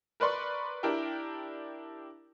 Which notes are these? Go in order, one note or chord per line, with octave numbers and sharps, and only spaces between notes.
A#4 B4 D5 C6 C#6
D4 E4 G4 A#4 G5